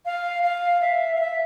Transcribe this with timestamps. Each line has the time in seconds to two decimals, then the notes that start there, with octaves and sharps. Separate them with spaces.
0.05 F5
0.43 F5
0.81 E5
1.15 F5
1.20 E5